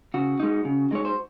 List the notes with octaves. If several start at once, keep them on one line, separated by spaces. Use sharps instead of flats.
C#3 F#4
G#3 D#4
C#3
G#3 D#4 C#5
C5